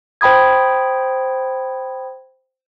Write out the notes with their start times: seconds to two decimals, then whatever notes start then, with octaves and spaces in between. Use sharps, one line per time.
0.21 C5 G5 B5 D#6 G#6